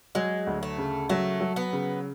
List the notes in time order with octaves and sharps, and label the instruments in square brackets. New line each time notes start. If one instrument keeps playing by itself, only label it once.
[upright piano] F#3 [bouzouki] G#3
[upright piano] D2
[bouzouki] A3
[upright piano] C#3
[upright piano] F#3 [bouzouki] A3
[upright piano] F#3
[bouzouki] B3
[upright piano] C#3